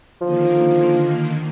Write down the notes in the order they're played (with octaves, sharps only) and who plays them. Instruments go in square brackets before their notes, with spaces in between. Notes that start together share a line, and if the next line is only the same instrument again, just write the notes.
[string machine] D3 D#3 A#3 [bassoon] F3